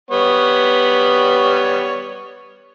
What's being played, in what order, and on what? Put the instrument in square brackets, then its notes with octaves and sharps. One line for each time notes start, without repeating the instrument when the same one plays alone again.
[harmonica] G3 B3 C#5